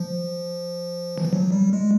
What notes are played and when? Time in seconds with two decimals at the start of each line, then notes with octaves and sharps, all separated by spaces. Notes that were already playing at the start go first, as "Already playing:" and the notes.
Already playing: F3
1.18 E3
1.25 F3
1.33 F#3
1.52 G3
1.73 G#3